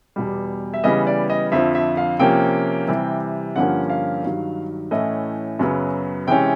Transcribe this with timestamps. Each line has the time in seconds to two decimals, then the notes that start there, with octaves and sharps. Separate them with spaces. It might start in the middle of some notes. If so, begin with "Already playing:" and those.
0.16 E2 B2 G3
0.74 E5
0.84 C#3 E3 G3 B3 D#5
1.07 D5
1.30 D#5
1.52 F2 D3 F3 E5
1.75 E5
1.97 F5
2.19 C3 F3 A#3 C#4 G5
2.88 C3 E3 G3
3.56 G2 D3 F3 A#3 C#4 F#5
3.90 F5
4.23 G2 D#3 F#3
4.91 A2 E3 A3 C#4 D#5
5.59 F#2 C#3 F#3 B3
6.27 C3 E3 G#3 C#4 G5